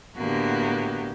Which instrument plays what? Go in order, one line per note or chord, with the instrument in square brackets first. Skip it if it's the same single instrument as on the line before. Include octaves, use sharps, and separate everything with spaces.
[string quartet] A2 D3 A#3 B3 F#4 G4